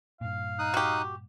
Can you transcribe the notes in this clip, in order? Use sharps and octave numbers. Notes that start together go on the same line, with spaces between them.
G2 A#2 F5
D#4 D#6 F#6
F#4 G4